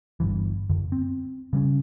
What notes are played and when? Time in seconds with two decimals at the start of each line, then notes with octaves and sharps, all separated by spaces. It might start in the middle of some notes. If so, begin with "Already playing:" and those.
0.20 G1 C#2 G2 E3
0.70 F#2 D3
0.92 C4
1.53 C#3 G3 B3 C#4